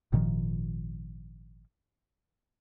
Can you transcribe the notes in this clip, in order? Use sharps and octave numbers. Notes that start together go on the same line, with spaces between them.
G#1 A#2 D#3 F3